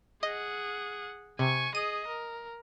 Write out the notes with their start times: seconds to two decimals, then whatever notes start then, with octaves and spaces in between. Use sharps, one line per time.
0.23 G#4 D#5 F#5
1.39 C3 G#5 C#6
1.75 G#4 D#5 D#7
2.08 A#4